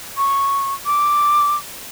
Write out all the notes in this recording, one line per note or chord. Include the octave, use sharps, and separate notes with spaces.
C#6
D6